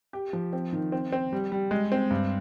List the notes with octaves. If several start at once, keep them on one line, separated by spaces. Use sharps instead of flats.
G4
F3
C4
D#3
C4
C4
G3
G3
G#3
C4
G2